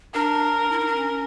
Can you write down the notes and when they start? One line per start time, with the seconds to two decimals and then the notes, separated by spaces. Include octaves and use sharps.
0.14 D4 A#4
0.71 E4
0.80 D#4
0.87 D4
0.95 C#4